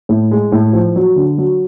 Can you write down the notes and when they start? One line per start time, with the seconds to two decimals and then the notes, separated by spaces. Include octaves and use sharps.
0.09 A2
0.31 G#3
0.52 A2
0.73 F3
0.96 F#3
1.16 D3
1.38 F#3